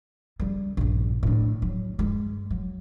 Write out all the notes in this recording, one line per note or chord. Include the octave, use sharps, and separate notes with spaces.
C#3 G3
A#1 G2
A2 D4
F#3
G2 G#3
F#3